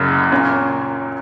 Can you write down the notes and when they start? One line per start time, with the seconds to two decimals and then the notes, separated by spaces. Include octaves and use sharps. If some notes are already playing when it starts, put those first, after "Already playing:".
Already playing: F#1 F#2 C#3
0.31 A#2 A#3 C#4